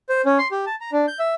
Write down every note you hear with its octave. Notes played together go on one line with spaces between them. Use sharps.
C5
C#4
C6
G4
A5
A#5
D4
G6
E5